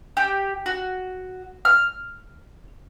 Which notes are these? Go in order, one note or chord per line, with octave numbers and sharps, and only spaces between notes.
G4
F#4
F6